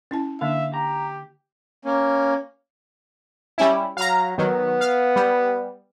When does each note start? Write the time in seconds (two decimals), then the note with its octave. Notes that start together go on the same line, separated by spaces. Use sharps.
0.11 C#4 E4 A5
0.41 D3 A#3 D4 E5 F5
0.74 G4 A#5
1.85 A#3 C#4
3.58 G3 C#4 E4
3.97 F#3 F5 A#5
4.38 D#3 F#3 B3
4.81 F5
5.16 G3